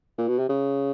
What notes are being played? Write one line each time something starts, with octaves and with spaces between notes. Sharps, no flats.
A#2
B2
C3
C#3